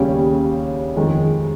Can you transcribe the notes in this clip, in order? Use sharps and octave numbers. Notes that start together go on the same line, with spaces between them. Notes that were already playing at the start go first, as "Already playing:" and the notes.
Already playing: D#2 C#3 G3 C#4 G#4
F2 D#3 G#3